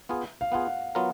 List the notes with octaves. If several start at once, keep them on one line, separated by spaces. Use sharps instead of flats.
B3 F4 G#4
F5
B3 F4 G#4 F#5
F#3 B3 F4 A#4